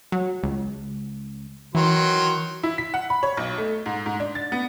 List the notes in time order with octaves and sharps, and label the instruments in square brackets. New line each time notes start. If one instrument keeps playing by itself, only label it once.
[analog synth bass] F#3
C#2
[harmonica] D#3 F#3 C6 [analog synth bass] E3
[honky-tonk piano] E4
B6
F#5
B5
C#5
B1
A3
G#2
G#2
D4
A6
B3